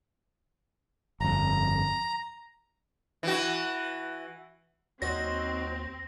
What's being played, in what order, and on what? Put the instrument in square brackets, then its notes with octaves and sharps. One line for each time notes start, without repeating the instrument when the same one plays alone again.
[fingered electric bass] G1 F2 [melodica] A#5
[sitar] E3 F#4
[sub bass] D#2 [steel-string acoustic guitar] F#3 D#4 F#4 [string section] C4 [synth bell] A#6